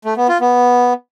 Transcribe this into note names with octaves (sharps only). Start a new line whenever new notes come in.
A3
B3
F4
B3